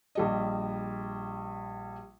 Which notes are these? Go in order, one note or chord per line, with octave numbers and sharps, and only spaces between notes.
A#1 G3 D#5